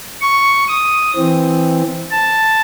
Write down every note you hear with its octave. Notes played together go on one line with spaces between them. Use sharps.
C#6
D#6
E3 C4
A5